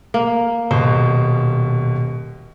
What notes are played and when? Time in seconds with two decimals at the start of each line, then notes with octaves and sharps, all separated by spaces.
0.14 A#3
0.71 D#1 B2 C5